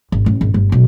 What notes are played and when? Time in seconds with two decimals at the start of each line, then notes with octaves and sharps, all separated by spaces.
0.12 G#1
0.26 A1
0.41 G#1
0.54 G1
0.72 B1